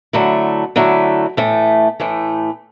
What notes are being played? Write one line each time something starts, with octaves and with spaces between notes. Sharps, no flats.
D3 F#3 A3 E4
D3 F#3 A3 E4
A2 E3 A3
A2 E3 A3